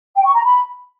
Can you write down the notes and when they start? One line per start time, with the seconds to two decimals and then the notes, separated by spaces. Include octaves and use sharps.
0.15 G5
0.25 C#6
0.34 A#5
0.44 B5